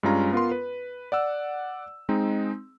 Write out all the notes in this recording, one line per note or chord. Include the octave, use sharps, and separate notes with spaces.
G2 G#3 C#4 F4 A#5
B3 F4 A#4 B4 C6
B4
D5 F#5 E6
G#3 C4 D#4